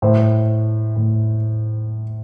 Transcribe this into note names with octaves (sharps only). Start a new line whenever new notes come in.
A2 C5
A2